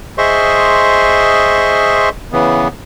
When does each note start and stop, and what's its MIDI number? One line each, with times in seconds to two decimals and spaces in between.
0.18 2.09 68
0.18 2.09 72
0.18 2.09 75
0.18 2.09 76
0.18 2.09 84
0.18 2.09 85
2.32 2.68 49
2.32 2.68 52
2.32 2.68 59